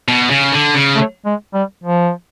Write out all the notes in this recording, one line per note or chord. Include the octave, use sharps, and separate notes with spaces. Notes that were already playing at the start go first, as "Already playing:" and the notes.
B2
C#3
D3
C#3
A3
G#3
G3
F3